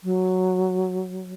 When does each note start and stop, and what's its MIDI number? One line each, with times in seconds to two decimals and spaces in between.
0.04 1.34 54